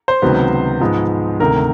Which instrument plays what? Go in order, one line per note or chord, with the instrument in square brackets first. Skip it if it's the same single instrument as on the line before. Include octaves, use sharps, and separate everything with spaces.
[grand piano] C5
C#2 C3 D#3 F#3 B3
G#2 F3 G#3 B3
D2 C3 D#3 A#4